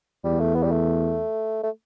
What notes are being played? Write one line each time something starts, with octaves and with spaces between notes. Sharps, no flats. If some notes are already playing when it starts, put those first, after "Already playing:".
E2 G3
A3
B3
G3
A3
A3